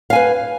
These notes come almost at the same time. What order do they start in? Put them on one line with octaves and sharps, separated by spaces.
F5 G#5 B4